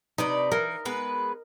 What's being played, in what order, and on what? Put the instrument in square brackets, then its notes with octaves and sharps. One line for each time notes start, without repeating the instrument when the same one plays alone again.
[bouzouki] C3 B4 D5 [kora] D#4
[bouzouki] E3 [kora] A#4
[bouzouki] G#3 B3 B4